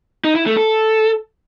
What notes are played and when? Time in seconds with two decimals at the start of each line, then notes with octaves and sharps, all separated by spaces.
0.24 D#4
0.35 E4
0.46 A3
0.57 A4